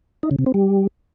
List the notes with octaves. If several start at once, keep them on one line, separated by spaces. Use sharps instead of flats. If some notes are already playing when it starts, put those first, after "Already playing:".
D#4
C#3
C3
C4
G3